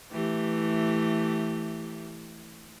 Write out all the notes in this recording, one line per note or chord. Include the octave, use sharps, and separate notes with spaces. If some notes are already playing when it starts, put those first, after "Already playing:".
E3 A3 G4